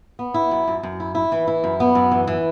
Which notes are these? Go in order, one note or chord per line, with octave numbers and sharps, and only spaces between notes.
B3
E4
F#2
F#2
F#2
E4
E4
E3
E4
F#2
B3
F#2
E3
E3